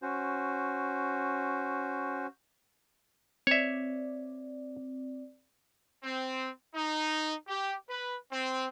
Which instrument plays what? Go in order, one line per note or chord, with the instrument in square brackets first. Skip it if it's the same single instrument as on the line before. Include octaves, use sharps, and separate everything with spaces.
[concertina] C#4 F#4 C5
[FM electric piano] C4 D5 [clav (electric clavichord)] C#5 E5
[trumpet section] C4
D#4
G4
B4
C4